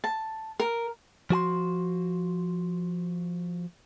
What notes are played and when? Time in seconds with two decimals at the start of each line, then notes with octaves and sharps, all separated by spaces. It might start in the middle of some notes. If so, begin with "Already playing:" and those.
0.04 A5
0.60 A#4
1.30 F3 F#4 G#5 C6